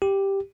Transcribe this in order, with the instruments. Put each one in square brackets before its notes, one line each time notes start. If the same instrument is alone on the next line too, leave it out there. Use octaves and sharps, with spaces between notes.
[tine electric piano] G4